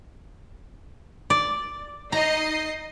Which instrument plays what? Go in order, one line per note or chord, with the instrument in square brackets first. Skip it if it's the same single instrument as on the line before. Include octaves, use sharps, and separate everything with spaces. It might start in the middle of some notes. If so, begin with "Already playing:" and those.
[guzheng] D5
[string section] D#4 D#5 C7 [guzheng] A#5